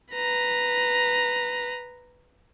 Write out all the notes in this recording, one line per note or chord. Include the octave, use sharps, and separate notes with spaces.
B4 A#5